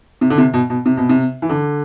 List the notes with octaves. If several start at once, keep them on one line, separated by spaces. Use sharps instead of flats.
C3
D3
C3
B2
B2
C3
B2
C3
E3
D3